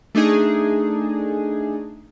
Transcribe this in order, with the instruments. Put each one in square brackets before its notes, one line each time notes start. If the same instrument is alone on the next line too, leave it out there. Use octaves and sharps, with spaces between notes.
[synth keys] A3 D4 D#4 G#4